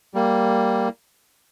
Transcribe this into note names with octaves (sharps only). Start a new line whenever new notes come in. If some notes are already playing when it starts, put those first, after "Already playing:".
G3 A#3